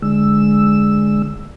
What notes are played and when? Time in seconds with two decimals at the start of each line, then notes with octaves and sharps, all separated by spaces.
0.02 D3 G#3 E6